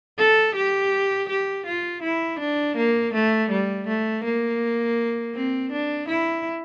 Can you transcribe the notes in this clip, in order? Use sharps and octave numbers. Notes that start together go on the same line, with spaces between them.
A4
G4
G4
F4
E4
D4
A#3
A3
G3
A3
A#3
C4
D4
E4